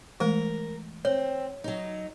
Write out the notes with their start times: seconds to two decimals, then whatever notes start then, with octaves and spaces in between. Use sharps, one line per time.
0.20 E3 G#3 A3 A#4
1.05 C4 C#5
1.64 F#3 D#4